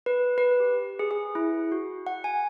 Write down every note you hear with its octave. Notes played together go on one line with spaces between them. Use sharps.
B4
B4
G4
G#4
G#4
E4
F#4
F#5
G#5